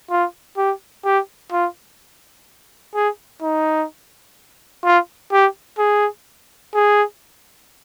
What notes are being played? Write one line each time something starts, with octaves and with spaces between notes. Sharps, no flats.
F4
G4
G4
F4
G#4
D#4
F4
G4
G#4
G#4